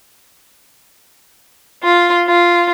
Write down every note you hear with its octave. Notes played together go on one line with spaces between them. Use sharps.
F4
F4